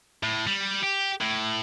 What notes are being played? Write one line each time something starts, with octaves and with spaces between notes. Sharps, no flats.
A2
G3
G4
A2